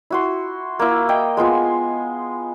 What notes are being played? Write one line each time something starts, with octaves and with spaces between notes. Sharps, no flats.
E4 F#4 C6
A#3 E4
D#5 G5
G#3 B3 F4 G#5